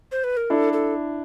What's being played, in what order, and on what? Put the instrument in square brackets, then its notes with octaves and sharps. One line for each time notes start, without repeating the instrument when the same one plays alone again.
[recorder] C5
B4
A#4
[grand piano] D4 E4 [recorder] A4
[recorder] A4